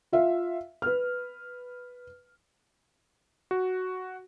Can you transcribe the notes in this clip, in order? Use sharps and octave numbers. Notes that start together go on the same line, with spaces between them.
F4 E5 F5
B4 F6
F#4